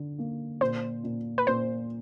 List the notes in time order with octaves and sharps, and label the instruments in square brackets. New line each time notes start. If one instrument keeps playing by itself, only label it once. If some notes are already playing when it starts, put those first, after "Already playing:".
Already playing: [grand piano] D3
A#3
[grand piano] A#2 [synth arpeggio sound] C5
[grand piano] A#2
[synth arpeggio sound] B4
[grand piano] A#2 [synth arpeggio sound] C5